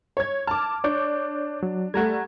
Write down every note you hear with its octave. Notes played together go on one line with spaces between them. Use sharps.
C#5 G#6
A5 D6 F6
D4 C#5 D6 G6
F#3
G3 A3 F#5 A#5 G#6